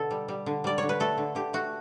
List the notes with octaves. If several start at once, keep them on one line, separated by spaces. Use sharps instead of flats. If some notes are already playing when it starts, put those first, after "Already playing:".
Already playing: B2 D3 A4
G3
G3
D3
G3 D5
D3 C#5
B4
A3 A4
D3
D3 G4
A3 F#4